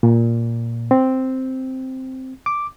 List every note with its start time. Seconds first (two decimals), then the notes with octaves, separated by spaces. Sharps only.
0.03 A#2
0.91 C4
2.46 D6